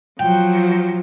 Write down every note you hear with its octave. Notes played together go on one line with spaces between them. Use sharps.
F3 F#3 G5